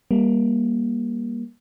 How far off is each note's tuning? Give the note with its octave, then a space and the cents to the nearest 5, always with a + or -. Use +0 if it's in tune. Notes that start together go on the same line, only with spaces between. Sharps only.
G3 +25 A#3 +25